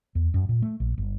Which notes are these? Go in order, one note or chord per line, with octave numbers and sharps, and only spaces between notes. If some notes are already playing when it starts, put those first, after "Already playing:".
E2
F#2
A#2
A3
A#1
G1